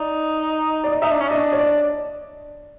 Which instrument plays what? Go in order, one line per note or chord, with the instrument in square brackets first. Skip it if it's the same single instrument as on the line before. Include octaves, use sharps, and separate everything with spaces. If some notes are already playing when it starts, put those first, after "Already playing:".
Already playing: [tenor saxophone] D#4 [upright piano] D5
[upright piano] D5
D#5
[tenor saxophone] D#4 [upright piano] E5
[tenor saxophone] D4
C#4
[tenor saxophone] D4 [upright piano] D#5
[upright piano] C#5
D5